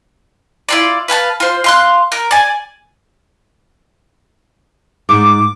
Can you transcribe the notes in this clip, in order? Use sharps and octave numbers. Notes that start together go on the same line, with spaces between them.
E4 F4 D5
B4 F5 G#5 A5
F4 C5
F5 C6 F#6
A#4
D5 G#5
G#2 D6